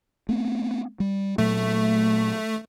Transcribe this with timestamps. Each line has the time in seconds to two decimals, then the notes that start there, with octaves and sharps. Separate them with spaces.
0.29 A3 B3 C4
1.00 G3
1.38 A#2 F#3 A3